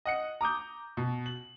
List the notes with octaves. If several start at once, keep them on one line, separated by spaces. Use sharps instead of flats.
D#5 F#5 C#7
A#5 D6 D#6 G6
B2
F#7